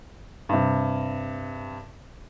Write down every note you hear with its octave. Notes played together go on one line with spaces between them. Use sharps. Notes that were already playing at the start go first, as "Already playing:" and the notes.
G2 C3